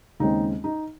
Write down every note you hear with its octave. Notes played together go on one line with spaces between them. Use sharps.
D#2 C#3 G#3 C4 D#4
D#4